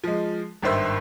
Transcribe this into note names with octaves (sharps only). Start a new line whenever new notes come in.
F3 G#3
G#1 G2 D#3 C5 E5 E6